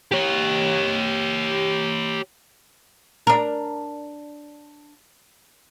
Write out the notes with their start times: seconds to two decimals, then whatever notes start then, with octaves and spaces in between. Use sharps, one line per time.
0.12 G4 C#5
3.27 D4 A#4